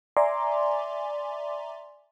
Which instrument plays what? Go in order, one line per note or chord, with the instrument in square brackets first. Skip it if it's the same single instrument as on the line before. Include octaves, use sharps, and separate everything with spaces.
[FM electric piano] D5 E5 G#5 A#5 C6 D6